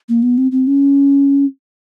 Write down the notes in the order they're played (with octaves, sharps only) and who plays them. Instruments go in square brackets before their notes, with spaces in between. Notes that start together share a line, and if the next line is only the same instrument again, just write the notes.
[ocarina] A#3
B3
C4
C4
C#4